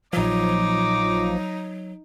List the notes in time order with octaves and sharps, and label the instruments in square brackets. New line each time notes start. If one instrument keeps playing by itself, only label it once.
[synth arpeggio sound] A#1 F3 [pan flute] F#3 [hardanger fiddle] D#4 [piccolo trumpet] D6